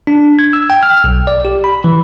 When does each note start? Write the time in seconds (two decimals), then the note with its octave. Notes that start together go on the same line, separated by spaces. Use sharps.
0.07 D4
0.39 G#6
0.53 E6
0.70 G5
0.83 F6
1.04 B1
1.27 D5
1.45 G4
1.64 B5
1.84 E3